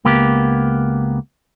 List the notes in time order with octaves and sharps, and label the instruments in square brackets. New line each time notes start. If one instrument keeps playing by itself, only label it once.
[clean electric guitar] C#2 A#3 B3 G4